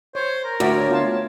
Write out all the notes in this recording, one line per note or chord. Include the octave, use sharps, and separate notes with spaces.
C5 C#5
A#4
D2 F#4 D5 E5
C#5
B3 F4 A5